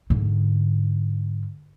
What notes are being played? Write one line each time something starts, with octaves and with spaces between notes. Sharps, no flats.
G#2 D3